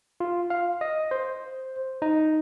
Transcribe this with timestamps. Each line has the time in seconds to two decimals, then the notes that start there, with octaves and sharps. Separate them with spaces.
0.20 F4
0.50 F5
0.81 D#5
1.11 C5
2.02 D#4